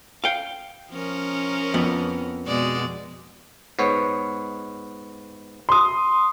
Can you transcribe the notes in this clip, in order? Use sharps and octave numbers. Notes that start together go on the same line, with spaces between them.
F5 G5
F3 C#4 A#4
F2 B3
B2 G#3 D5
G#2 B3 C#5
C6 D#6